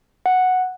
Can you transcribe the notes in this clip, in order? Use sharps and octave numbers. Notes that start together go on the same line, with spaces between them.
F#5